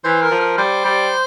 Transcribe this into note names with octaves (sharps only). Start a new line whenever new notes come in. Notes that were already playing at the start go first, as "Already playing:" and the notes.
E3 C5
A#4
F3
A#4
G3 C5
G3